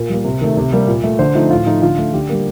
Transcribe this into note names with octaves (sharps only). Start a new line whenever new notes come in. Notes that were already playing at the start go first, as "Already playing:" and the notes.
Already playing: A#2 A#4
G3 A#3
C3
D#3 A3
C3
G3 A#3
A#2
A3
D3 C5
F3 A3 D#4
A2 F4
F3 A3 D#4
D3 F4
A3
D3 G4
G3 A#3